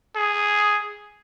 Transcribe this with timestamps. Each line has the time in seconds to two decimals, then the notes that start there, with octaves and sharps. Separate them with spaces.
0.16 G#4